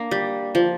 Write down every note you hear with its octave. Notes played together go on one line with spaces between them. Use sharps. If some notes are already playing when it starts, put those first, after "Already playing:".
Already playing: A#3 D4
G3
F3